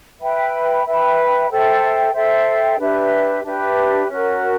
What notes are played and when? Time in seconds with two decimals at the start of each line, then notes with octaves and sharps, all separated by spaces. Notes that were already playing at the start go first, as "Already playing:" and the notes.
0.20 B4 E5 G5 B5
0.85 B4 E5 G5 B5
1.50 A4 C5 E5 G5
2.14 A4 C5 E5 G5
2.79 D4 G4 B4 E5
3.43 D4 G4 B4 E5
4.08 C#4 F#4 A#4